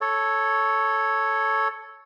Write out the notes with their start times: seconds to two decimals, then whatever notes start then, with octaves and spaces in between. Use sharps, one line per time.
0.01 A4 C#5